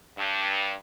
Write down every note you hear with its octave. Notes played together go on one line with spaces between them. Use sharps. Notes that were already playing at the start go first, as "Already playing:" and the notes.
G2